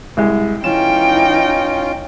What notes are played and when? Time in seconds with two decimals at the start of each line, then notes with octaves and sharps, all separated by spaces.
0.17 C2 G#3
0.64 E3 C#4 D#4 F4 G5 E7